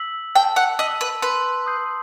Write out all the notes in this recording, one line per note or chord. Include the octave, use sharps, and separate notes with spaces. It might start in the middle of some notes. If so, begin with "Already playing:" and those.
Already playing: E6 B6 F#7
G5 A5
F#5
D#5 E6 B6 F#7
B4
B4 C6
D#6 G6 C7